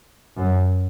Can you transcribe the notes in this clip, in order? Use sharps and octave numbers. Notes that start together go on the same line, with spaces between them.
F#2